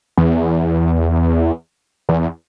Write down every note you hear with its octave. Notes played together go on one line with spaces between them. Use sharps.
E2
E2